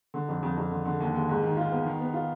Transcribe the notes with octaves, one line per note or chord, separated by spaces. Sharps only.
D3
F2
F2
F2
D3
D3
D#2
D#2
G#2
D#3
F4
B3
D#3
B3
F4